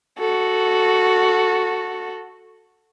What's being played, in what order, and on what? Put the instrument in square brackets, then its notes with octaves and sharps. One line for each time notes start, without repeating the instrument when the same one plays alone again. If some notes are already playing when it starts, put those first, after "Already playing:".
[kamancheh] F#4 A4